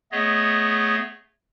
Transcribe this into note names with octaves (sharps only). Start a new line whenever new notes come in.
A3 B3 G#4 C#5 D#5